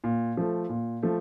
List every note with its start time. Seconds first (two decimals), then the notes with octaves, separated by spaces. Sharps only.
0.04 A#2
0.37 F3 A3
0.69 A#2
1.03 F3 A3